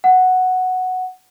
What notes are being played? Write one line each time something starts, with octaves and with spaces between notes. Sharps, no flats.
F#5